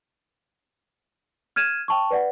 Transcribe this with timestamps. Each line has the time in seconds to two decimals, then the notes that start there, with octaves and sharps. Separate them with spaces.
1.56 F6 G#6 D#7 E7
1.88 G5 A5 C#6
2.11 B4 D5 F#5